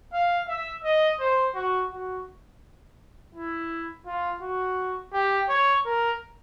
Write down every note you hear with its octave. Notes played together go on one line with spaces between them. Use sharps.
F5
E5
D#5
C5
F#4
F#4
E4
F4
F#4
G4
C#5
A#4